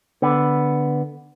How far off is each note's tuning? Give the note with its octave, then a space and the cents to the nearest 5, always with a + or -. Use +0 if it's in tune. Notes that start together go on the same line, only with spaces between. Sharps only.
D3 +0 B3 +0